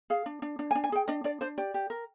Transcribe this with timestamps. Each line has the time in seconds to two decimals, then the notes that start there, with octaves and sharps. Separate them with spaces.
0.10 G#4 F5
0.26 D4
0.42 D4
0.59 D4
0.71 G#5
0.75 D4
0.84 G#5
0.92 G#4 G5
1.08 D4 D#5
1.24 D4 D5
1.41 D4 C5
1.58 G4 D5
1.74 G4
1.90 A#4